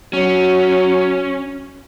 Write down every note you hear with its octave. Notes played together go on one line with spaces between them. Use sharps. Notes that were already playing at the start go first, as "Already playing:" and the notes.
F#3 C#4